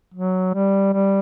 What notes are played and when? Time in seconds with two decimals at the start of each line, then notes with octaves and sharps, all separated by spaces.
0.14 F#3
0.54 G3
0.93 G3